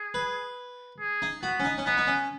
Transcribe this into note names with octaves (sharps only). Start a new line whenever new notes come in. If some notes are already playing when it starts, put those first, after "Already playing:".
Already playing: G#4
B4
G#4
D#4
B3 F#4
C#4
D#4
C#4
B3 D#4
D#4
C#4